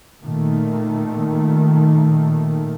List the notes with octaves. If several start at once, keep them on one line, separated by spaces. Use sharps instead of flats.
A#2 D#3 A3